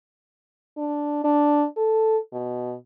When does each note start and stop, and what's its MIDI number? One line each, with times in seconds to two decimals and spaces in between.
0.77 1.19 62
1.24 1.66 62
1.77 2.17 69
2.33 2.75 47